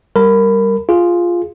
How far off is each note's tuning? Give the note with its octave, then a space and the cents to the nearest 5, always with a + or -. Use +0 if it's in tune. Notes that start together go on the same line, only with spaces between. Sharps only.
G3 +0 A#4 -10 B5 +15
F4 +0 G#4 +0